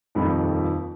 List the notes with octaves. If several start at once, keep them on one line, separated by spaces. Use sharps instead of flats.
D#1 F2 D#3 F3 B5